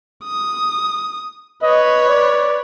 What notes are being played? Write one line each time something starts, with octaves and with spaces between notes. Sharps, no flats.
D#6
B4 C#5 D#5
D5